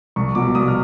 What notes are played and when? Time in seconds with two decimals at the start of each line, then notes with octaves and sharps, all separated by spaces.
0.16 C2 C#6
0.35 B2 F#3 D6
0.55 C2 D#6
0.68 F6